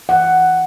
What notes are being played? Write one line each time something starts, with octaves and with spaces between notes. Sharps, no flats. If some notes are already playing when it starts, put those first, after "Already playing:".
E3 F#5